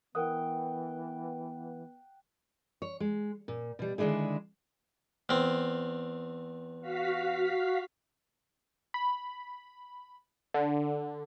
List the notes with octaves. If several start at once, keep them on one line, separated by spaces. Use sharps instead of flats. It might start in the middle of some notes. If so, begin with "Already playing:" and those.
E3 B3 A#4 F#5 G5 D#6
C#5
G#3
A#2
B2 G3
D3 D#3 G#3 D4 E4 G#4
E2 C4
F#4 F5 B6
B5
D3